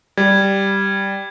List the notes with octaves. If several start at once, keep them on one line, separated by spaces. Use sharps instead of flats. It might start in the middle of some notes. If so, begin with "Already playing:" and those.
G3 G#6